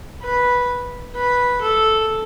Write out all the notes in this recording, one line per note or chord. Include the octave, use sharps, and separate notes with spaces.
B4
B4
A4